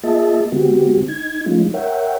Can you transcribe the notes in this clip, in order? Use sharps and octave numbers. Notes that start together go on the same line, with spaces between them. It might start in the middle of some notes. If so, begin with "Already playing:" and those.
A#3 F4 G#4 D#5 E5 A5
D3 G#3 B3 C4 F#4 G4
D#4 G#6
F3 G#3 A3 C#4 D#4 F4
A#4 C#5 E5 F#5 G5